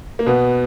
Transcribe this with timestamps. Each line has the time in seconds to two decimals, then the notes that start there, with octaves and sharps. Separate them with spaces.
0.19 A#3
0.26 B2 B3